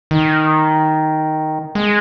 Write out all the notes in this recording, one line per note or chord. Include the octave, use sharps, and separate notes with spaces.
D#3
G#3